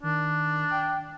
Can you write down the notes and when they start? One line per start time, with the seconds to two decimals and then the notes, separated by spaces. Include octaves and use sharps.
0.03 D#3 D4
0.71 G5